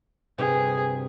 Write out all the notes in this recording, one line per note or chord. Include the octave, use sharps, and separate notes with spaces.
D2 G2 C3 G#4